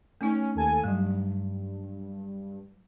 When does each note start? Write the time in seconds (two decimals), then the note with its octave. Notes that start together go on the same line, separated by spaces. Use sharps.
0.21 A3 C#4 D#4
0.55 D#2 A4 G#5
0.84 G2 F#3 G3